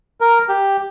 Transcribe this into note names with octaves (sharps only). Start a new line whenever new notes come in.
A#4
G4